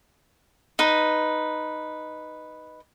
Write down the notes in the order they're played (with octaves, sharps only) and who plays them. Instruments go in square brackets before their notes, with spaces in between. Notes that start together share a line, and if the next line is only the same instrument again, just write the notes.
[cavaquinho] D#4 B4